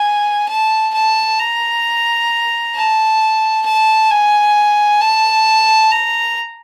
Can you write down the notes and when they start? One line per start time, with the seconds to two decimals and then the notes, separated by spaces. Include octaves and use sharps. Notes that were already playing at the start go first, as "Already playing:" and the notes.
Already playing: G#5
0.48 A5
0.94 A5
1.39 A#5
2.75 A5
3.65 A5
4.10 G#5
5.01 A5
5.91 A#5